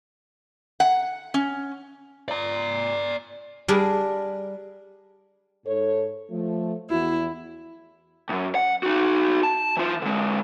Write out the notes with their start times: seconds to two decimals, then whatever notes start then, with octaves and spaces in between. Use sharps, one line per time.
0.80 F#5
1.34 C#4
2.28 D5 A#5
3.68 G3 D4 G#4 A#4
5.66 G#2 A4 C#5
6.31 F3 A3
6.90 E2 E4 F#4
8.29 C#2 F#2
8.55 F#5
8.83 D#4 F#4
9.43 A5
9.77 E3 F4
10.02 D3 G#3